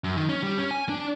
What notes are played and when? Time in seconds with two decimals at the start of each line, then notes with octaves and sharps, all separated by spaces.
0.04 F#2
0.16 D#3
0.29 C#4
0.43 G3
0.58 C#4
0.71 G#5
0.89 D4